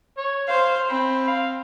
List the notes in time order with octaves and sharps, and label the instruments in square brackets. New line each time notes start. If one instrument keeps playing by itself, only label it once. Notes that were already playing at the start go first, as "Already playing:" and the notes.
[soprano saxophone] C#5
[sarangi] C5 [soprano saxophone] F5
[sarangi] C4 [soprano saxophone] B5
[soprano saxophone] F5